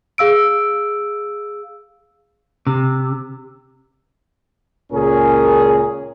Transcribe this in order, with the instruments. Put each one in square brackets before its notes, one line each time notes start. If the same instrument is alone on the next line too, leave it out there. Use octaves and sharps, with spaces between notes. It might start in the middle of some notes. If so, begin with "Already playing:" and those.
[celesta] G#4 F5 E6 D7
[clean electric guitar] C3
[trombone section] C#2 A#2 C#3 C#4 G#4 A#4